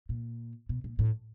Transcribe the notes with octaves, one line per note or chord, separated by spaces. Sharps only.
A#2
B2
A#2
A2